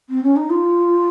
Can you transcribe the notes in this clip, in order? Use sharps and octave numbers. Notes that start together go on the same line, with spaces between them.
C4
C#4
D#4
F4